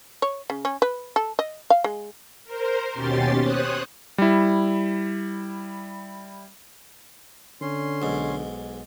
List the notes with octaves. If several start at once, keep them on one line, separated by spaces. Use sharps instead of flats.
C#5
C#3
C#4
B4
A4
D#5
F5
G#3
A#4 C5
D#2 B2 C#4 G4 C6 A6
C5 C#5 D#6 F#6
G3 E4
D3 C#4 C6
B1 G#2